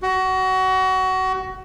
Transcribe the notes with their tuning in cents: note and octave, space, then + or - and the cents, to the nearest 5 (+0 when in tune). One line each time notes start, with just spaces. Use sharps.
F#4 +25